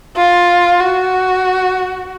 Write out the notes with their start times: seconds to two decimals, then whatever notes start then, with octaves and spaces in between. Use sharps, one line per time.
0.16 F4
0.80 F#4